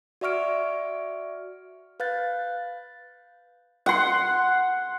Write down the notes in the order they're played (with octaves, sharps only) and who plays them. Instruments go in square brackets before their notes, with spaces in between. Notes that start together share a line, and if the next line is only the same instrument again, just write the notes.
[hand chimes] F#4 D5 E5 C#6 F6 D7
B4 F5 F#6 G6 A6
[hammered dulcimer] F#5 C6